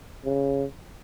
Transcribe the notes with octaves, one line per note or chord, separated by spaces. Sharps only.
C#3